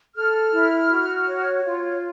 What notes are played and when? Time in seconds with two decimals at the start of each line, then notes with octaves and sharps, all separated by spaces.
0.15 A4 F6
0.52 E4
0.89 F#4
1.26 C#5
1.63 F4